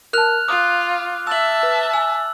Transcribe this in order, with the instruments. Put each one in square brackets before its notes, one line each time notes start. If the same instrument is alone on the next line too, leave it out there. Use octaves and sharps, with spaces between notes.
[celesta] A#4 A5 [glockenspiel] F6 F#6 F7
[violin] F4 [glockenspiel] D6 [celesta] D#6 F#6
[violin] E5 A5 [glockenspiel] E6 F#7
[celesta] B4
[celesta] G#5 [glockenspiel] E6